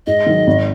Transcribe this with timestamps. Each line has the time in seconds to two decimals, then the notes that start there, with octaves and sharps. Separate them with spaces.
0.07 G#2 D#5
0.26 D#3 F#3
0.47 G#1